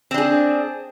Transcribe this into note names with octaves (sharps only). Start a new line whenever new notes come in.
C4 D4 G#4